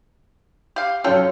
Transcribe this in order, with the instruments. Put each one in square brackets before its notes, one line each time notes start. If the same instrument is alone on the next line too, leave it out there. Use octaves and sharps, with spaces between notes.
[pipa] G4 F5
[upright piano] F#2 C#4 [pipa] F4 A4 G5